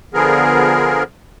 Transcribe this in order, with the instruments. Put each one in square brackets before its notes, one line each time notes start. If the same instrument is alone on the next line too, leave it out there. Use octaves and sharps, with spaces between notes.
[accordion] D3 F3 B3 G#4 A#4